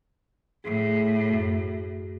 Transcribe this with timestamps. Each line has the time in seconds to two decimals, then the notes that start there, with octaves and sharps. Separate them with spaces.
0.64 A2 G#4
1.31 F#2